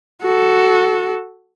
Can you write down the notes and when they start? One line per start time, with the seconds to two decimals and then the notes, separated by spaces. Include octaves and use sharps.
0.22 F#4 A4